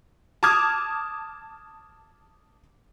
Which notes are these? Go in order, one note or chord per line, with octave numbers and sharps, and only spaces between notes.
A5 D6 D#6 F6 G#6